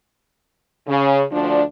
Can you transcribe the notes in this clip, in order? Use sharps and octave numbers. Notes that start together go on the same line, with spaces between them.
C#3
D2 F3 D4